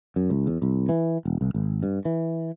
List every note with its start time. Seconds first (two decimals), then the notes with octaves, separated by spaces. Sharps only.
0.16 F#2
0.30 C#2
0.47 E2
0.62 C2
0.89 E3
1.25 E1
1.41 C2
1.54 G#1
1.83 G2
2.05 E3